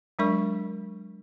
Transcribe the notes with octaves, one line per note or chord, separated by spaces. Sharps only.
F#3 G#3 D4 A#4 D5 C#6